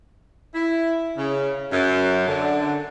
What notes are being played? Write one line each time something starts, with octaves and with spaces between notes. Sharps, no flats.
E4
C#3
F#2
D3